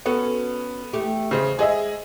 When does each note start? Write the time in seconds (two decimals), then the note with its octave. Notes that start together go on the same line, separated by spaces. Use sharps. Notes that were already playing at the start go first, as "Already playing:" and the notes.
0.06 B3 C#4 F#4 A4
0.93 E2 A3 G4
1.31 E2 C#3 C5 D#5
1.59 G#3 G#4 D#5 E5